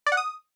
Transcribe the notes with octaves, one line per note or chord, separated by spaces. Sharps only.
D5
F#5
D#6